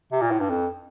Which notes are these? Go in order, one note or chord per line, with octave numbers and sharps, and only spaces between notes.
C3
A#2
A2
G2
F2